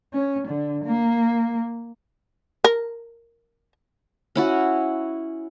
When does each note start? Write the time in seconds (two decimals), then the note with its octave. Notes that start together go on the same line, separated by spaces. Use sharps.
0.13 C#4
0.48 D3
0.84 A#3
2.64 A#4
4.36 C#4 E4 F#4